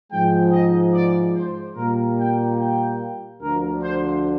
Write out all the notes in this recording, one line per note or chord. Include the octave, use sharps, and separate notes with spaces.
G#2 F3 G#3 G5
D#5
D5
C5
A#2 G3 A#3 A#4
G5
G5
D2 D3 F3 A#4
C5